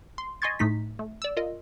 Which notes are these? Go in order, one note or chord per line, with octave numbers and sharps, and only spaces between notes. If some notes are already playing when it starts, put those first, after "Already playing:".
C6
D#5 G#5 C6 C#6 G#6 A6
A2 A3 D#4 B6
A3
D5 E6
F4 A#4 D#5